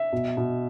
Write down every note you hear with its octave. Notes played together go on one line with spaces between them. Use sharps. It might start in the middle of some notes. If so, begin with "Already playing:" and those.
Already playing: E5
B2
B2